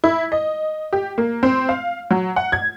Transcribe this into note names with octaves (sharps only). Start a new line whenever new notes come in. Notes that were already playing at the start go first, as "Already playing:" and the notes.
E4
D#5
G4
A#3
C4
F5
F#3
F#5
G#6